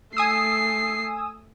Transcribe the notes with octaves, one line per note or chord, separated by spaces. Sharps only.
A3 G#5 D#6 E6 C7